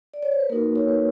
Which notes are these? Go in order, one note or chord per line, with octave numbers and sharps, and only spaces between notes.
D5
C#5
C5
B4
A#3 D#4 F#4 A#4
C#5
B4